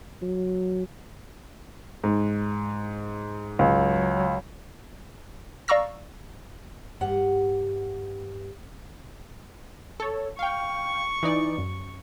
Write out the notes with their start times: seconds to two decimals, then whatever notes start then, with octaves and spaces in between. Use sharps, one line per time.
0.22 F#3
2.04 G#2
3.59 C#2 F#3
5.68 D5 F5 A#5 C#6 E6 A#6
7.01 G2 G4 F#5
10.00 A4 C#5
10.39 F5 G5 C#6
11.23 E3 D#4 D5
11.58 F#2